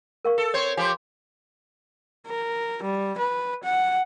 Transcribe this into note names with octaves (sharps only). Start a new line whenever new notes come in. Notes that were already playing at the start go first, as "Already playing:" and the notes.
A#4 F5 C#6
A4
C4 C5 C#5
F3 G4 G#5 C6
A#4
G3
B4
F#5